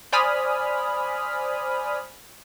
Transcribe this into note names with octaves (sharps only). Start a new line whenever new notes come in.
C5 D5 G#5 B5 D#6 F6